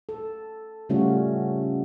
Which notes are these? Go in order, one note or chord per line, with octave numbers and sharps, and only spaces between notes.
A4
C#3 G3 A3 C#4 F4 F#4